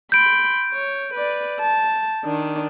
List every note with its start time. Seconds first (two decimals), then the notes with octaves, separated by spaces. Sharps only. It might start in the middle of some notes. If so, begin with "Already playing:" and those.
0.12 B5 C6 G6 D7
0.72 C#5
1.14 B4 D5
1.60 A5
2.25 D#3 D4